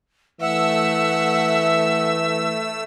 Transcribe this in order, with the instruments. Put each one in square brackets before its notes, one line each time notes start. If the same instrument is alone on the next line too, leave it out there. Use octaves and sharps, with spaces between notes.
[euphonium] E3 [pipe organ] A3 E6 [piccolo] E5 [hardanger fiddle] F#5